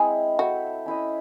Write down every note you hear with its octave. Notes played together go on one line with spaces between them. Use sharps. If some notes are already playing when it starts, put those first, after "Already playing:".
Already playing: G#3 C4 E4 G#4
E4 F#4 A4 C5 E5
C#4 E4 C5 D#5